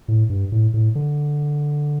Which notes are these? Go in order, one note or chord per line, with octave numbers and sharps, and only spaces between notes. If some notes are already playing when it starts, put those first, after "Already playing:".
A2
G2
A2
A2
D3